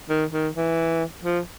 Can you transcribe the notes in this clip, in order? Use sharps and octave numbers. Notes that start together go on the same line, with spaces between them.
D#3
D#3
E3
F3